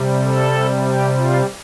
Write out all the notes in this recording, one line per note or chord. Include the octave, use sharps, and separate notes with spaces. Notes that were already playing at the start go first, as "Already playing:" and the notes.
Already playing: C3 G3
A4
G4
F4